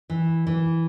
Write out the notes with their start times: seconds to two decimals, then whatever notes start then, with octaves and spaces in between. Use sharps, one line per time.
0.10 E3
0.47 E3